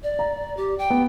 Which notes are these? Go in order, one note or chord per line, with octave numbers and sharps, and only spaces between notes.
D5
A#5
G4
G5
B3